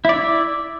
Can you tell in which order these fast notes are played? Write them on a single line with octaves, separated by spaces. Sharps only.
E4 D5 E5